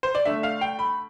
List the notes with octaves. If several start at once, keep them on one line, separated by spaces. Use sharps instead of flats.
C5
D5
D3 A3 D4 E5
F5
G5
B5